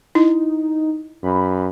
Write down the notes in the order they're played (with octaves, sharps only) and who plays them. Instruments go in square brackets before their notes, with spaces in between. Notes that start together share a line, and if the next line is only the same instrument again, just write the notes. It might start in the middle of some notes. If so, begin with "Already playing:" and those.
[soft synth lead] D#4 [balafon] E4
[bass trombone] F#2 [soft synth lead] B5